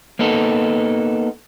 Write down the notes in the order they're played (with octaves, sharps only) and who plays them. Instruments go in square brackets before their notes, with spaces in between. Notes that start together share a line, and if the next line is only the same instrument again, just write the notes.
[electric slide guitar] A#3 B3 D#4 A4